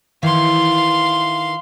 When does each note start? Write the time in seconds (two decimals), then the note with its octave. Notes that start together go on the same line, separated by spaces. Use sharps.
0.23 D#3 E3 E4 F5 C6